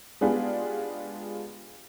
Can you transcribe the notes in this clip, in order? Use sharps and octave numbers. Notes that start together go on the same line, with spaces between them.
G#3 B3 D4 F4 G4 G#4